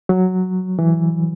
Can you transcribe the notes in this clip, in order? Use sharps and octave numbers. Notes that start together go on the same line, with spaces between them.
F#3
E3